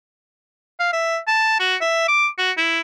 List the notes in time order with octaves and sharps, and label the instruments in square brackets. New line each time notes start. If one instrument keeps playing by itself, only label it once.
[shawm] F5
E5
A5
F#4
E5
D6
F#4
E4